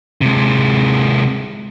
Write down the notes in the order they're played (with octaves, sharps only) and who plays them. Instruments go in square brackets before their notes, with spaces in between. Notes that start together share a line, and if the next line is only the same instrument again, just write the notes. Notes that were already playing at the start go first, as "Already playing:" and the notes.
[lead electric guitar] C3 G#3